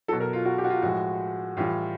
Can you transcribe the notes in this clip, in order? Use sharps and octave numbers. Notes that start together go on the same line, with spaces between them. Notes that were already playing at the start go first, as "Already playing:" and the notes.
B2 F#3 A4
A#4
F4
F#4
G4
F#4
F4
A2 F3 G#3 F#4
A2 E3 G3 F4